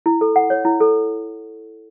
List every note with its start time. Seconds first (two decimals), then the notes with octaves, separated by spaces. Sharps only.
0.06 E4
0.21 A4
0.36 F#5
0.50 C#5
0.65 E4
0.80 A4